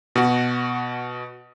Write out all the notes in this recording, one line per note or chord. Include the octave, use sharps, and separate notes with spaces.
B2 F#4